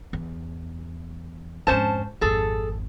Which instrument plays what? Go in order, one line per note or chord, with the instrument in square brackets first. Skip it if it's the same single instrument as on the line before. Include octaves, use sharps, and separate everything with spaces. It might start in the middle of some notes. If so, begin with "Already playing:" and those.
[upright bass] E2
[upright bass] F2 G#2 [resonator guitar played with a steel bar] C#4 C5 A5
[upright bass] G#1 F2 [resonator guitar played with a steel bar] G#4 A4